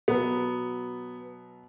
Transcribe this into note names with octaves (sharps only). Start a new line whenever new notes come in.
B2 F#3 B3